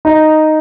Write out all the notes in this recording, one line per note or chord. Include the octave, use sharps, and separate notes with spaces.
D#4